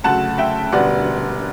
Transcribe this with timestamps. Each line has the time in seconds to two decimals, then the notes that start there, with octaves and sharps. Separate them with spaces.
0.04 D2 C#3 F#3 A3 F#5 A5
0.38 E5 G5
0.72 E1 D2 D3 G3 B3 D5 F#5